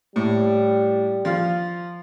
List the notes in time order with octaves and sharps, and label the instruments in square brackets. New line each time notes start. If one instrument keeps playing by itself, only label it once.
[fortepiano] A2 [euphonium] G3
[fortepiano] F3 F5